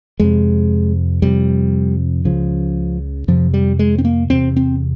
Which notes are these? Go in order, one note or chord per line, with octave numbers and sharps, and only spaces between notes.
F2 C3 G#3
F2 C3 G3
C#2 C#3 F3
F2 C3 F3
G3
G#3
C4
A#3
E2 C3 C4
C4